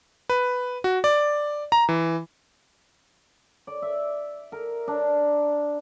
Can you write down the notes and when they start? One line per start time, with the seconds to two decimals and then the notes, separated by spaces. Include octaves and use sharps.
0.30 B4
0.84 F#4
1.04 D5
1.72 A#5
1.89 E3
3.67 D5
3.82 E5
4.52 A#4
4.88 D4